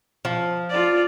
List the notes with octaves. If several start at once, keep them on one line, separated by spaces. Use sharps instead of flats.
F3
F4 D5